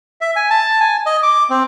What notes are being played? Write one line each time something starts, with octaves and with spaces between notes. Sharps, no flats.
E5
G#5
A5
G#5
D#5
D6
C4